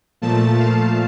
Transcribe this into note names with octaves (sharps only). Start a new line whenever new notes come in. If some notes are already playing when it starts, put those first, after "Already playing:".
A#2 F3 A3 A5
F5